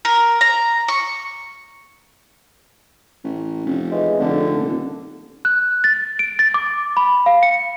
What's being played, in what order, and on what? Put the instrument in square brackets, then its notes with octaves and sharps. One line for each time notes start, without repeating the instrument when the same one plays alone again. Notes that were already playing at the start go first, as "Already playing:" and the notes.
[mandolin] A#4
A#5
C#6
[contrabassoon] A1
F1
[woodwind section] C#3 E3 G#3
[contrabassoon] F1 [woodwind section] D3
[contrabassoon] D#1
[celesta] F#6
A6
D7
A6
D6
B5
F5
C#7